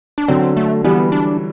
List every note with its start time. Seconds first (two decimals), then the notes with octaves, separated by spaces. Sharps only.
0.18 D4
0.28 D3 F#3 C4
0.57 A3
0.84 E3 G3 B3
1.12 D4